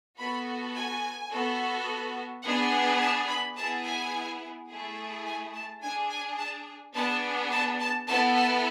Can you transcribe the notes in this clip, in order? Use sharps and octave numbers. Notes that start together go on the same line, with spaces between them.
B3 F#4 A4 B5
G#5
B3 F#4 A4
B3 D4 G#4 F#5
A5
B5
B3 E4 G#4 A5
G#5
A3 E4 G#4
G#5
A5
D4 G#4 G#5
G#5
A5
B3 D4 G#4 A5
A5
A5
B3 E4 A4 A5
A5